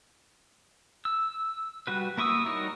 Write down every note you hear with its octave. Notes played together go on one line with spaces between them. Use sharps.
E6
G3 F#4 B4
A#3 E4 C#6 D#6 E6
G3 D#4 F#4 A#4 C#5